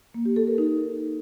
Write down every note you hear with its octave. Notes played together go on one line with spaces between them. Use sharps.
A#3
G4
A4
A#4
D#4